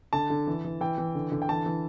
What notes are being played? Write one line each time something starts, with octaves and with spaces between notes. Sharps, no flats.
D3 A5
D3
E3
E3
E3 G5
E3
D3
D3
G5
E3 A5
E3